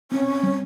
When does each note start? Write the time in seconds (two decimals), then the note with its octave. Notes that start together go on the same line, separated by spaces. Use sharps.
0.11 C4 C#4
0.43 G3